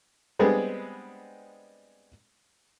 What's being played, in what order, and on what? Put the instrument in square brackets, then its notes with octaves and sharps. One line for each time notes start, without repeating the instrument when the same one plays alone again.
[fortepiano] G3 G#3 B3 C4 D4 G#4